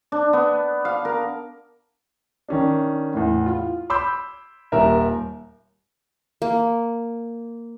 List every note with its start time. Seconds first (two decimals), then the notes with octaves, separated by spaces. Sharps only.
0.12 D4
0.33 B3
0.85 F5
1.05 A#4
2.49 D#3 C#4 D4
3.14 E2 A2
3.46 F4
3.90 B5 C6 D6 E6 G6
4.72 D#1 A#4 E5
6.42 A#3